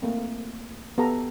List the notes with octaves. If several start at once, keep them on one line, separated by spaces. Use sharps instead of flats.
A3 A#3 C4
B3 G4 A4 A#5